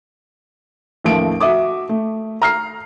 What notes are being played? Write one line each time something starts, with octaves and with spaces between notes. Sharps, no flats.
A1 D#2 F3 A3 D7
F#4 E5 D6 D#6
A3
A#5 F6 C7